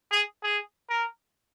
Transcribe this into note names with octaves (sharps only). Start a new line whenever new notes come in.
G#4
G#4
A#4